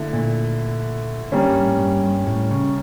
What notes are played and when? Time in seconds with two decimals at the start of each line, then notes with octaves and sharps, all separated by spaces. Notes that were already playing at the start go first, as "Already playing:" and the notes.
Already playing: D3 A3 E4
0.13 A#2
1.31 D3 G3 A#3 C#4
1.47 G2
1.63 A2
1.79 G2
2.03 G2
2.27 A2
2.51 C#3